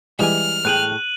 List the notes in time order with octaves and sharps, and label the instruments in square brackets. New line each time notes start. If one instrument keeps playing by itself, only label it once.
[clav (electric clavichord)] E3 G3 G#3 [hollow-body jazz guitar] E5 G#5 [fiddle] F6
[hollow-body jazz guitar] A2 G#4 G5 [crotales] F#6 D#7 F#7